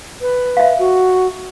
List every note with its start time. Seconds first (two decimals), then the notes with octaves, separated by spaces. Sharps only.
0.21 B4
0.57 E5 F5
0.79 F#4